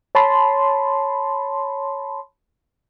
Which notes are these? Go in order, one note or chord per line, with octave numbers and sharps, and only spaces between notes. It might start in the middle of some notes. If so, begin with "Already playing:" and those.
C#5 A5 B5 C6